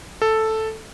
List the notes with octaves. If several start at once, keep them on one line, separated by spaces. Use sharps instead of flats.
A4